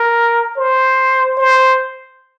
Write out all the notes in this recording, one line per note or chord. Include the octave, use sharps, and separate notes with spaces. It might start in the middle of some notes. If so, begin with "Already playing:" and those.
Already playing: A#4
C5
C5